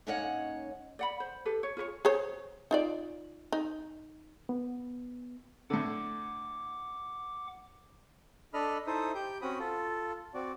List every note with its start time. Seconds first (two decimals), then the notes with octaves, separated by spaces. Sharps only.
0.07 G#2 A#3 C#4 C#5 D#5 F#5
0.99 D5 F#5 B5
1.20 C5
1.45 G4 A4 B4
1.63 C#5
1.77 F4 G#4 B4 C#5
2.05 G#4 C5 C#5
2.71 D#4 F4 D5
3.52 D#4
4.49 B3
5.70 A2 D3 F#5 D6
8.54 D4 A4 D#5 B5 F6
8.87 D#4 E4 A4 C5 E5 D#6
9.15 G4 G5 G6
9.42 C4 C#4 F#4 B5 D#6
9.59 F4 A4
10.34 C4 F#4 D5